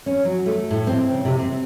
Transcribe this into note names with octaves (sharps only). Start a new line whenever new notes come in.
C#4
F#3
A3
A2
C4
C#3
C3
C4